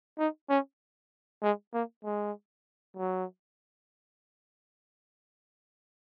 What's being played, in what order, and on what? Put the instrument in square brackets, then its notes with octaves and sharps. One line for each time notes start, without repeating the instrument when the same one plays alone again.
[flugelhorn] D#4
C#4
G#3
A#3
G#3
F#3